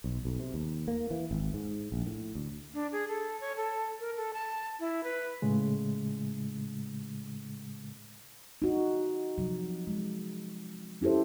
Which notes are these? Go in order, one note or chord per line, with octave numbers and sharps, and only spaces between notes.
B1
B1
C3
D#2
A#3
E3
G#1
G#2
A#1
A2
D2
D4
G#4
A4
C#5
A4
A#4
A4
A5
E4
B4
A2 C#3 G#3
D#4 F#4
C3 F3 F#3
G#3
C#4 E4 G4 A4 C5